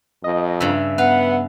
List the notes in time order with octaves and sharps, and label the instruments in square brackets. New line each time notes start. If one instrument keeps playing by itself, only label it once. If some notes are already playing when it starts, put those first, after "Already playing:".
[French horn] F2 [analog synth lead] D#5
[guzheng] G2 C#3 [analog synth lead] E5
[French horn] B3 [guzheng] B4 F5 [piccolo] F#5